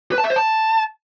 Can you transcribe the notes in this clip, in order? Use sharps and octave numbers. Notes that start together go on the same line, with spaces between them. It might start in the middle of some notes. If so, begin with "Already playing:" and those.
B4
A5
E5
C5
A5